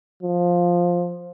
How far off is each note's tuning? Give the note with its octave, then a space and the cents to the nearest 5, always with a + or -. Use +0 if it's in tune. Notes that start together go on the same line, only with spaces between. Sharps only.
F3 +10